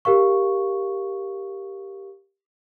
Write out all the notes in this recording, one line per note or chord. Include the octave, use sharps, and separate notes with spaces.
G4 A#4 F5 C#6